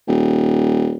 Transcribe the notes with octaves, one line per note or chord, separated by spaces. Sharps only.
D#1